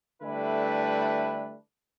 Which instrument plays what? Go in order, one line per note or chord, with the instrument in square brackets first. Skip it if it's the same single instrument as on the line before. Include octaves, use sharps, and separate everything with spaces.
[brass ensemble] D3 G3 A3 D4 E4 B4